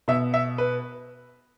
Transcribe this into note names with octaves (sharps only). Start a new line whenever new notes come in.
B2 E5
E5
B4